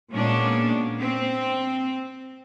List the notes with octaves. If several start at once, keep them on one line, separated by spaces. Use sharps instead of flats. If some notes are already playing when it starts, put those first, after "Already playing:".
A#2 G#3 A#3 B3 C#4 D4
C4